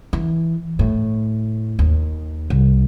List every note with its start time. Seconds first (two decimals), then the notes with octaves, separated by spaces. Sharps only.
0.13 E3
0.79 A2
1.79 D#2
2.50 C2